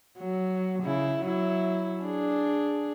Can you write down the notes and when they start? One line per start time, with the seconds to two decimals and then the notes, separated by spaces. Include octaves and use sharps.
0.19 F#3
0.82 C#3 E4
1.21 F#3 E4
2.03 D4 G#4